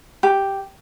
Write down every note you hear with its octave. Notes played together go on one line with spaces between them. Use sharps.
G4